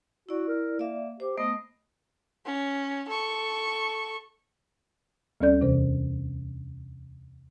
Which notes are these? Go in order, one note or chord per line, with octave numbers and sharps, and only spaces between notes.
E4 F#4 D5
A#4
A#3 D5 E5
G4 C5
A3 B3 D#5
C#4
A4 C#6
D2 G3 C#4 A4 D5 G6
E2 C3 E3 C5